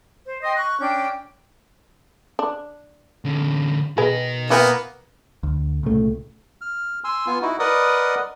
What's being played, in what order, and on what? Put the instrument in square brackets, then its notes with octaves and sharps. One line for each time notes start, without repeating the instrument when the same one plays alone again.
[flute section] C5
D#5 G5 C6 D#6
C#6 F#6
C#4 D4 G5 G6
[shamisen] D4
[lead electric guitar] D3 C#4
[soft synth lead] B2 [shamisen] G#4 B4 [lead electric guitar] A#4 D#5
[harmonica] A#3 B3 [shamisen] E4 G5 G#5
[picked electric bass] D2
C2 A#2 C#3 A3
[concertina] F6
G#5 C6 E6
B3 F4 G#5
D#4 E4 F#4
A#4 B4 D5 D#5 F#5 D#6